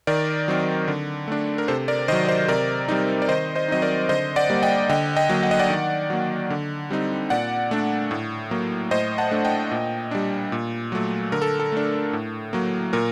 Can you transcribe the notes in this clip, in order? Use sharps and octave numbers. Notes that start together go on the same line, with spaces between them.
D#3 A#4 D5
F#3 C4 D#4
D3
A3 D4
A#4
C3 A4 C5
A#4 D5
D#3 F#3 C5 D#5
C5 D#5
C3 A#4 D5
G3 C4 D#4
D5
D#3 C5 D#5
C5 D#5
F#3 C4 D#4 D#5
A#4 D5
D3 C5 D#5
D5 F#5
G3 A#3
D#5 G5
D3 D#5 G5
D#5 G5
F#3 A#3
F#5
D#5
D5 F#5
D#3
F#3 A#3
D3
G3 C4 D#4
A#2 D5 F#5
A3 D4
A2
F#3 A#3
A2 C5 D#5
F#5 A5
A3 D4
D#5 G5
A#2
G3 D4
A#2
F#3 A3
D3 A#4
A4
A4
A3 D4
A2
F#3 A#3
A#2 A#4